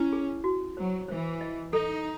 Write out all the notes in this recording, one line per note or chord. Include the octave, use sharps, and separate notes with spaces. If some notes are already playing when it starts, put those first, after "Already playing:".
Already playing: C#4 E4
G#4
F#4
F#3 C5
E3 C5
D#5
D#4 A4